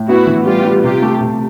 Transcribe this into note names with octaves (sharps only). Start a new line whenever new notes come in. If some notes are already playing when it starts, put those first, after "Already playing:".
Already playing: A2
B3 E4 F#4
E3
G3 F4 G4
G3
C3 F4 G4
A3
C3